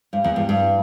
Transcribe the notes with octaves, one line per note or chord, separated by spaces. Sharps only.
G2
E2
G2
G2